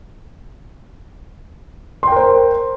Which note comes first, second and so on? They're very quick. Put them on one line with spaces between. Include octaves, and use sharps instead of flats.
C6 G5 A#4 C5